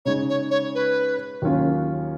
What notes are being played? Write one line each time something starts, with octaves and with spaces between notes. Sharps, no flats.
C#3 G#3 D#4 C#5
C#5
C#5
B4
D#2 D#3 F#3 C#4 F4